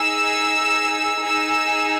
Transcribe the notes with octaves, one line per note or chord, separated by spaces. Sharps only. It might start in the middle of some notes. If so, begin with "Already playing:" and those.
Already playing: D#4 G#4 E6
D#4 G#4 E6